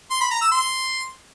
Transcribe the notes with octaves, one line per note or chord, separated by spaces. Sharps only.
C6
B5
A#5
E6
C6